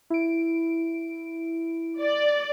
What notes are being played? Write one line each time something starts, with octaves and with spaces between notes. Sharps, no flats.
E4 D7
D5